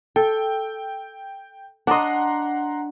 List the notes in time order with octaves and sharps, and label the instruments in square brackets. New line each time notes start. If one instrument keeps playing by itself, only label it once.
[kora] A4 [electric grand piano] G5
[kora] D4 D#5 [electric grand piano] F#5 A#5 C6